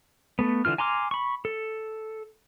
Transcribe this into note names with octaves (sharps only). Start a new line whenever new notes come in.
A3 B3
D3 E3 F4 F6
G#5 A#5 C6 D6 F6
B5 C#6
A4